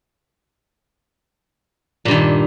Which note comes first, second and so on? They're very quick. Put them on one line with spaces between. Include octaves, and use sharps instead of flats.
A#2 G2 D#3